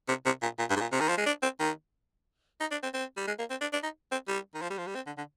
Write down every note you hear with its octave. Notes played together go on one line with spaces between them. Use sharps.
C3
C3
A#2
A#2
G2
G#2
A#2
C3
D#3
F3
G#3
D4
C4
D#3
D#4
D4
C4
C4
G3
G#3
A#3
C4
D4
D4
D#4
C4
G3
D#3
F3
G3
F3
G3
C4
D3
D3